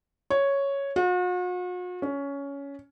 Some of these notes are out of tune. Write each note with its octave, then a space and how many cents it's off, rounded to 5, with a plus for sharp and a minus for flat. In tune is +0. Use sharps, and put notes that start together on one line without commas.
C#5 +0
F#4 -45
C#4 +15